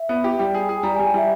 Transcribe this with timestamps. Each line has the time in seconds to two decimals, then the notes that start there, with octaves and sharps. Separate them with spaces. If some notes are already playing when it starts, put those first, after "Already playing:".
Already playing: E5
0.09 B3
0.24 G4
0.39 G3 G5
0.54 G#4
0.69 G#4
0.83 G3 A#5
0.95 G#5
0.99 G3
1.06 G5
1.14 G3 E5